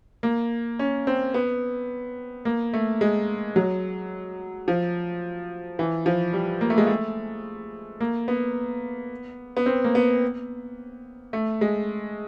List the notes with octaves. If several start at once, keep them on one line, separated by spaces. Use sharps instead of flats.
A#3
C#4
C4
B3
A#3
A3
G#3
F#3
F3
E3
F3
G3
A#3
A3
G#3
A3
A#3
B3
B3
C4
A#3
B3
A3
G#3